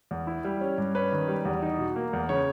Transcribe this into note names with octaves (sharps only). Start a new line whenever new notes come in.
E2
E4
G3
C#4
G2
C#4 B4
D#3
G3
E2
D#4
B2
A#3
E2
C#3 C#5